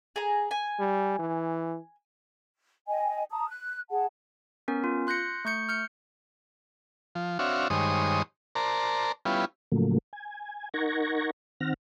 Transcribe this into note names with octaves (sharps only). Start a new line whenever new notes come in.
G#4 A#5
G#5
G3
E3
D#5 G5 G#5
A5 A#5 D#6
F#6
G#4 F#5 A5
B3 C#4 A#4
F4
C6 F#6 G6 A#6 C#7
A3 C#6 G6 C#7
F6 G6 C#7
F3
C4 D4 F#4 C#5 E5 F5
G2 D#3 G#3 C5 C#5 D#6
A#4 C5 D5 A5 A#5
G3 B3 C#4 E4 F4
A2 C#3 F3 F#3 A3 A#3
G#5
D#4 A#4 F#5 C#6 G#6 A#6
D#3 C4 F#5 F6 A#6